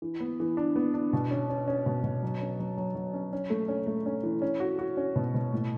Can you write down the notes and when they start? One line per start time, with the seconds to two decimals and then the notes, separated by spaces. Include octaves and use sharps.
0.02 E3
0.20 B3
0.40 E3
0.57 D4
0.76 B3
0.94 D4
1.13 B2
1.31 C#4
1.50 C#4
1.68 C#4
1.86 B2
2.04 B2
2.23 F#3
2.41 C#4
2.60 F#3
2.77 F#3
2.95 F#3
3.14 C#4
3.33 C#4
3.50 A3
3.68 C#4
3.87 A3
4.06 C#4
4.23 E3
4.42 C#4
4.60 F#4
4.79 F#4
4.97 C#4
5.16 B2
5.34 B2
5.53 A2